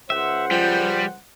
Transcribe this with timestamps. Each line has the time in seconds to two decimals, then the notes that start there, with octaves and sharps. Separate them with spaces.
0.10 C#2 C5 E5 F#5
0.51 F3 G3 G5